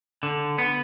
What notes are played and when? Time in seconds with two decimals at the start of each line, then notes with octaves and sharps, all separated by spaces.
0.23 D3
0.58 B3